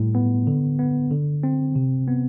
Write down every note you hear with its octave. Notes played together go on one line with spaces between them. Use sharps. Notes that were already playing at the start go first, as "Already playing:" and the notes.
Already playing: A2 G3
B3
D3
B3
D3
C4
C3
B3